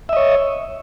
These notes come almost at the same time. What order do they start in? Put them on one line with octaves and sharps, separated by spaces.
E5 D#5 C#5